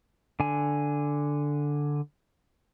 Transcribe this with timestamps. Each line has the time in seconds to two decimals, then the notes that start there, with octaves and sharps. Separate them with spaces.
0.40 D3 G#5